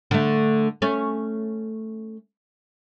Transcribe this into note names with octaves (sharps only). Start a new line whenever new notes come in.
D3 A3
A3 C#4